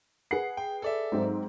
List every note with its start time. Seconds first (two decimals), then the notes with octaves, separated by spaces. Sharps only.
0.31 G#4 B4 F#5 C7
0.57 G5
0.82 A4 D5 E5
1.12 G#2 F#3 C4